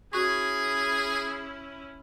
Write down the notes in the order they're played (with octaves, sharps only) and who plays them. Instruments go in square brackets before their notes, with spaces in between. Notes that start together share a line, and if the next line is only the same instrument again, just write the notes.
[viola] C#4 E4 [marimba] F#4 C#6 [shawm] G#4